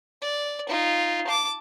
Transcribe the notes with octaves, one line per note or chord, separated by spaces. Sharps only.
D5
D#4 F4
A5 D6